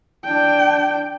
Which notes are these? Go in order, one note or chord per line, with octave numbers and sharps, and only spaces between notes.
D4 G5